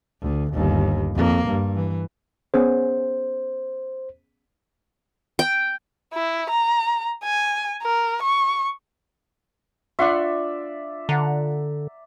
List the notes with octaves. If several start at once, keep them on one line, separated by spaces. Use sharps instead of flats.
D2
G1 D#2
F2 A#3
G2
E3
B3 C#4 G#4 C5
G5
E4
A#5
G#5
A#4
C#6
D4 F4 D5 E5 F#5 C6 C#6
D3 F#5 A#5